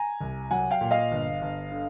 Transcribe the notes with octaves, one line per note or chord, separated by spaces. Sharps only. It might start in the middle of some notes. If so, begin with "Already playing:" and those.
Already playing: G#5 A#5
C2
F#3 F#5 G#5
F5 G5
A#2
D#5 F5
G1
G1
D3